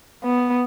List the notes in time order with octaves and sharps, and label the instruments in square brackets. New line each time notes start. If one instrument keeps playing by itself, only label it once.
[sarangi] B3